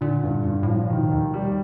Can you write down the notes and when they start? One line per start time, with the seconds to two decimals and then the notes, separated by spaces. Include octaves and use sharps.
0.01 A#2 D3
0.23 G2
0.45 G2
0.63 A2 F3
0.76 A#2
0.89 B2 D#3
1.11 D#2
1.34 G3